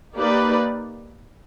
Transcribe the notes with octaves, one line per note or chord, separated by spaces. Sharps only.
A#3 D#4 G4 B4 D5